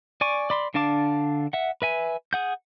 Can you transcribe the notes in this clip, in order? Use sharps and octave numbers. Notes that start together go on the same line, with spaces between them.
D5 G#5 C#6
D5 B5 C6
D3 D4 F5 A5 D6
E5 F#5
B4 E5 G#5
G#4 F#5 G6